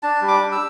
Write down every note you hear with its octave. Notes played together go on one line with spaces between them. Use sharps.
D4 A5
G3
D6
D4
E6